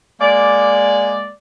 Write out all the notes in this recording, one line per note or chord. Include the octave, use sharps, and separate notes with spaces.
G#3 A#3 D5